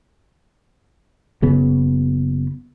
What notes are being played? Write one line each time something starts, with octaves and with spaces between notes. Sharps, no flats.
F#1 C#3 B3